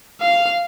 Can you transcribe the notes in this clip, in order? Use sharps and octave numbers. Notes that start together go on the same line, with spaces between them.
F5